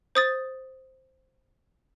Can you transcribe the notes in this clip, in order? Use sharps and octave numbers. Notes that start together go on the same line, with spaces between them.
C5 D#6 A6